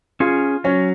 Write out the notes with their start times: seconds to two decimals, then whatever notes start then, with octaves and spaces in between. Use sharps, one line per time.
0.20 C#4 F4 G#4
0.64 F#3 C#4